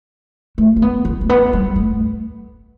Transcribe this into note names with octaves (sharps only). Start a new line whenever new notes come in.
A3
C4
B3
C4
A3
B3
G3
A3